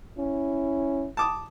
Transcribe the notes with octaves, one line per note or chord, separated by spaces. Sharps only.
C#4 E4
A5 D6 D#6